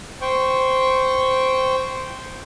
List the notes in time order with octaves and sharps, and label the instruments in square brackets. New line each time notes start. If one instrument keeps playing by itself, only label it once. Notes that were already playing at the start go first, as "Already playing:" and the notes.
[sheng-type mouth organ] C5 G5 C#6